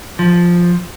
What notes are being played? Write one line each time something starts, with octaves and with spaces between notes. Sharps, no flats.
F3